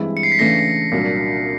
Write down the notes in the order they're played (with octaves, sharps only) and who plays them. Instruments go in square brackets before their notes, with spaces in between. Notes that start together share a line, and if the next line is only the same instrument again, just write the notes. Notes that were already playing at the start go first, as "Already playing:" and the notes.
Already playing: [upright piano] G2 E3 G#3 C4 E4
[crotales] C#7
C7
B6
[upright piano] C#3 E3 A3 D4 [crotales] A#6
[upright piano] C2 A#2 F#3 A#3 D4